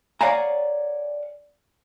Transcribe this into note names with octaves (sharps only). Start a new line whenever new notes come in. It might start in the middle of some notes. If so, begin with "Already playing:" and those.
C#5 D5 F5 F#5 G#5 A#5